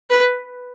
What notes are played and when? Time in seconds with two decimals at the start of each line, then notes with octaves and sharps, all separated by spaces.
0.10 B4